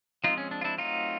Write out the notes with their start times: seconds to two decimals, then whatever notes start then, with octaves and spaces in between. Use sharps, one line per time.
0.24 F3 G#3 C4 D#4 F4
0.38 C#4
0.51 D4
0.61 F4
0.64 D4 E4
0.78 F#3 A3 C4 D#4 F4